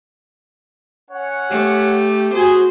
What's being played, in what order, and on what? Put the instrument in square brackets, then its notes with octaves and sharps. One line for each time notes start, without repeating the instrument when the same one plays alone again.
[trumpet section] C#4 C#5 F#5
[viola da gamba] A3 [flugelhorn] G4
[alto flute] F#4 [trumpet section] G#4 [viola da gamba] C5